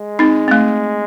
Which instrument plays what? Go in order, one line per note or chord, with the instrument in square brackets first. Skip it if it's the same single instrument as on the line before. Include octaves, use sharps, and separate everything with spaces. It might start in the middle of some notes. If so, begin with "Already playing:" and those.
Already playing: [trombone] G#3
[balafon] C4 D#4
C4
A3